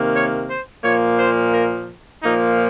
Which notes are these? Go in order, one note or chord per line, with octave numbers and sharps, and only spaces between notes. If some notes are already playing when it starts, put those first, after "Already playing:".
Already playing: C3 D#3 A#3
C#5
C5
A#2 F3 A#3 C#5
C5
A#4
A#2 F3 A#3 D#4